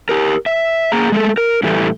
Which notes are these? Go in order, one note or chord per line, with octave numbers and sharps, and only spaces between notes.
G4 A#4
E5
A#3 G#4 A#5
G#3 A3 A4
A#4
A2 E3 G3 A3